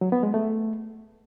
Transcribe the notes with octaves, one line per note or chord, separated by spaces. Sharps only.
F#3
B3
G#3
A3